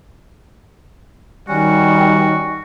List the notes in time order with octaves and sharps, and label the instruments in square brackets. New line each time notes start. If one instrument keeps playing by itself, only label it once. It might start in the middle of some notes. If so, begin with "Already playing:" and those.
[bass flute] D#3 [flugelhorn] G3 [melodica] C#4 [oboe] F#4